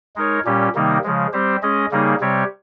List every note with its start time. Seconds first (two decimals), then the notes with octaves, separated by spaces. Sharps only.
0.16 G#3 D#4 A#4 C#5
0.45 A#2 G3 C#4 G4
0.75 C3 D#3 G3 A#3 D#4
1.04 C#3 F3 G#3
1.33 G3 C4 G4 C5
1.63 G#3 C#4 G#4 D#5
1.91 C#3 G3 A#3 D#4 G#4
2.21 C3 G3 C4 G4 C#5